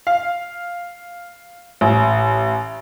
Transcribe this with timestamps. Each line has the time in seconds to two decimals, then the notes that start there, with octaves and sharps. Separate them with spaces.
0.07 F5
1.81 A1